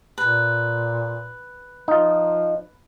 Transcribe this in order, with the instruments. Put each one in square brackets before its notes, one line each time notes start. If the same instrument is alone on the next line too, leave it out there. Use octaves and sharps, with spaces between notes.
[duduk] A#2 [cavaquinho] B4
[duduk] F3 [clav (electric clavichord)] D#4 F4